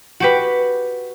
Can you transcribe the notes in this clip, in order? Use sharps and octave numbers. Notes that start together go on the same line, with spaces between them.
F#4 G4 B4